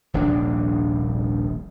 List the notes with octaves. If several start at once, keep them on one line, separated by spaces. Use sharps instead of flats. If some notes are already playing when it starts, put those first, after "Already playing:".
D#1 A#1 C3 D4